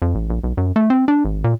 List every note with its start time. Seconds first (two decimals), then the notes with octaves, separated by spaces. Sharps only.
0.02 F2
0.15 A1
0.30 A#1
0.44 B1
0.57 F#2
0.76 A3
0.90 C4
1.08 D4
1.25 G#1
1.44 A#2